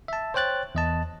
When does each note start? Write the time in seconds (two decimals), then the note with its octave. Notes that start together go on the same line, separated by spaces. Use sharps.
0.08 E5 A5
0.34 C5 C#5 G5 F#6 A6
0.75 E2 D#5 A5